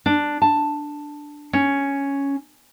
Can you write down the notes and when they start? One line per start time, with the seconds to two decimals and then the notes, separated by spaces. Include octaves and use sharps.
0.06 D4
0.42 A5
1.53 C#4